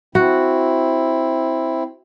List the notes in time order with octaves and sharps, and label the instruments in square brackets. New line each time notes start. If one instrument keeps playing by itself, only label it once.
[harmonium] C4 E4 [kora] F#4